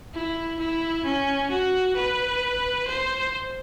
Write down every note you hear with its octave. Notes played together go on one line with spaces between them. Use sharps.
E4
E4
C#4
F#4
B4
C5